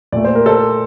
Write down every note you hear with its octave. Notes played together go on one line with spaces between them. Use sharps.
A#2 A3 D5
C5
A#4
A4 C5